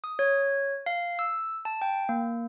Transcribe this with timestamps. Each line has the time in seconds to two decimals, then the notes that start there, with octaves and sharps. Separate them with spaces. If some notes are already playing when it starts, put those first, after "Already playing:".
0.04 D#6
0.19 C#5
0.86 F5
1.19 E6
1.65 A5
1.82 G5
2.09 A#3